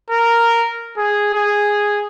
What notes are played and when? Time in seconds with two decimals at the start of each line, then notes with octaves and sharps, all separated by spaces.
0.10 A#4
0.98 G#4
1.34 G#4